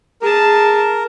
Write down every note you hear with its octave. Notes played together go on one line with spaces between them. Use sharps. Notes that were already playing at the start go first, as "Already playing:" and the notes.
G#4 A#4 A5